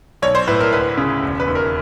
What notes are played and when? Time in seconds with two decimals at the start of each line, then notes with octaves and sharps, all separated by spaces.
0.22 B1 C#5
0.35 C5
0.48 A2 B4
0.61 A#4
0.73 D2 B4
0.97 C#3
1.23 E1
1.40 B4
1.47 D#2
1.55 A#4